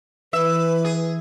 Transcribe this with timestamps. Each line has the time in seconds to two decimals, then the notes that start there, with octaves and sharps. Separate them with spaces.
0.33 E3 B4 E5
0.85 G#4